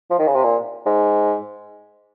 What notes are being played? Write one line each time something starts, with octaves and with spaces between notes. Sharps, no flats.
F3
D#3
C#3
C3
A#2
G#2